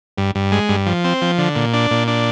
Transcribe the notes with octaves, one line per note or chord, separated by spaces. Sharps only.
G2
G2
G#3
G2
F3
C4
F3
D3
A#2
D4
A#2
D4